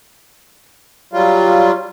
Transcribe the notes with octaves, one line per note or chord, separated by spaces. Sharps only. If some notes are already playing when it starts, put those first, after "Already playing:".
F#3 G3 F4